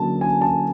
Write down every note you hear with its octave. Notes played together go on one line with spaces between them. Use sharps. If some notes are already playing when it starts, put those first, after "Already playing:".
Already playing: D3 F#3 A#3 A5
G#5
A5